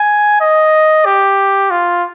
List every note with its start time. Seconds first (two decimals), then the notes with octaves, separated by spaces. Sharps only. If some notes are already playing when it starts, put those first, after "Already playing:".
Already playing: G#5
0.41 D#5
1.06 G4
1.71 F4